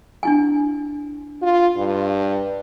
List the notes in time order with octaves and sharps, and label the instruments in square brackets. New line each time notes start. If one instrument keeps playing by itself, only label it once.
[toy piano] D4 E4 G#5
[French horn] F4
G2